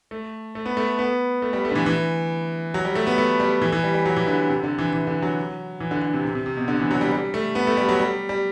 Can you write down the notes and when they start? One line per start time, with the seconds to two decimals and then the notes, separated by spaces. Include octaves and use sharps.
0.11 A3
0.55 A3
0.66 B3
0.77 A3
0.99 B3
1.42 A3
1.53 G3
1.65 A3
1.71 D3
1.75 E3
1.86 E3
2.74 F#3
2.85 G3
2.95 A3
3.07 B3
3.18 A3
3.40 G3
3.62 E3
3.72 E3
3.84 G3
3.94 G3
4.06 F#3
4.17 E3
4.27 D3
4.49 C3
4.64 D3
4.79 E3
4.93 E3
5.07 D3
5.22 F#3
5.80 E3
5.91 D3
6.02 D3
6.13 C3
6.25 C3
6.35 C3
6.46 C3
6.57 B2
6.68 D3
6.79 E3
6.91 F#3
7.01 G3
7.12 G3
7.34 A3
7.55 B3
7.67 A3
7.77 G3
7.89 F#3
8.00 G3
8.29 G3